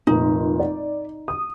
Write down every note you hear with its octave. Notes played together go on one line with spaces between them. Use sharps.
F1 A#2 D#4
D5
D#6